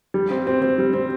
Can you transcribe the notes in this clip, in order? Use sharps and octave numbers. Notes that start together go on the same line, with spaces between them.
G3
C4
C4
C4
G3
C4